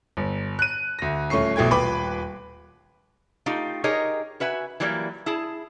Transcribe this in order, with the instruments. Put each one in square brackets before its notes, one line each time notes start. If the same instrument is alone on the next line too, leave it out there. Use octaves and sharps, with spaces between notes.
[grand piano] G1
F#6 D#7
D2 A#6
D#1 A3 C#4 C#6 C7
A#1 B2 A3 G5 G#6
D#1 B4 G5 B5 D6
[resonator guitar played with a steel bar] A3 D#4 F4 G4
D#4 G4 G#4 A#4 C#5 D#5
F#4 B4 E5 G#5
E3 F#3 G3 A#3 E4
E4 G#4 A5